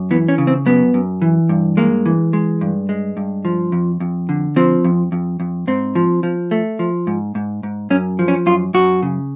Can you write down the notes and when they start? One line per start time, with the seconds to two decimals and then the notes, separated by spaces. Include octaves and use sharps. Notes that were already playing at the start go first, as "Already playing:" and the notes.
Already playing: F#2
0.11 E3 B3
0.28 C#4
0.38 C#3
0.47 C4
0.66 F#2 B3
0.94 F#2
1.22 E3
1.49 G2
1.77 G#3 A#3
2.06 E3
2.33 G#3
2.61 G2
2.89 G#3
3.17 G2
3.45 F3
3.72 F2
4.00 F2
4.29 D3
4.56 F3 C4
4.84 F2
5.12 F2
5.40 F2
5.67 G#2 C4
5.95 F3
6.23 F3
6.51 A3
6.79 F3
7.07 G#2
7.35 G#2
7.63 G#2
7.90 F#2 C#4
8.19 F3
8.28 C#4
8.46 F#2 F4
8.74 F#2 F#4
9.03 C#3